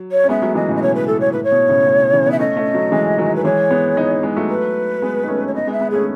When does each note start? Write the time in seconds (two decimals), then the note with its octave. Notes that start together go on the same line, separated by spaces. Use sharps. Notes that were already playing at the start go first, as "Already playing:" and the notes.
Already playing: F#3
0.12 C#5
0.24 C#4
0.29 G#3 B3 E5
0.42 F#3 A3
0.55 E3 G#3 D#5
0.68 A2 C#3
0.76 D#5
0.82 B2 C#5
0.95 B4
1.07 A2 A4
1.21 C#5
1.32 A2 B4
1.44 C#5
1.52 B2
1.69 A2 C#3
1.87 A2
2.00 B2
2.13 C#3 E3
2.26 B3 D#4
2.32 E5
2.39 A3 C#4 D#5
2.57 A3 C#4
2.74 F#3 A3
2.92 E3 G#3
3.18 D#3 F#3
3.35 B4
3.45 E3 G#3 C#5
3.71 G#3 B3
3.97 B3 D#4
4.23 G#3 B3
4.36 F#3 A3
4.49 B4
5.02 G#3 B3
5.24 D#4
5.28 A3 C#4
5.47 C#5
5.55 B3 D#4 D#5
5.67 G#3 B3
5.72 E5
5.81 G#3 B3
5.90 A3 C#4 G#4